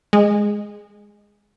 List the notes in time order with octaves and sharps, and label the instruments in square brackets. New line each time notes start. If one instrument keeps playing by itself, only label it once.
[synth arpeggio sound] G#3